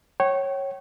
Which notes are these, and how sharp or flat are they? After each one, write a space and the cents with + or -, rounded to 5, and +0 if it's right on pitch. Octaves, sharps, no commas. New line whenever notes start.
C#5 -15 G5 -40